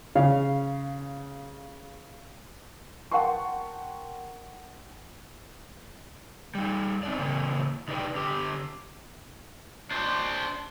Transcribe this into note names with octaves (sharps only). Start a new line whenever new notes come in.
C#3 F5
A#4 F#5 G5 A5 C6 C#6
G3 D#4
C4 D#4 D5
C#3 E3 A#3 C4
C3 D#4 G4 B4 D5 G5
D3 G4
D4 C5